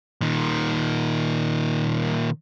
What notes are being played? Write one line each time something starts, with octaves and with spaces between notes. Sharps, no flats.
A#2 D#3